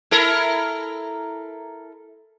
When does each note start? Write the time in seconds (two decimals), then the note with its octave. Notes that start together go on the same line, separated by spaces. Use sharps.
0.11 E4 A4 A#4